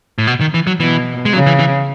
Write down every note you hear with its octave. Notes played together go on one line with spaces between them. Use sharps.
A2
B2
D#3
E3
F#3
B2 E3
G#3
C#3 F#3
E3
E3